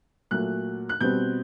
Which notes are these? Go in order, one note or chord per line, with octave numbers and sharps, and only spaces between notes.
A#2 F#3 A3 F#6
F#6
B2 G3 C4 G6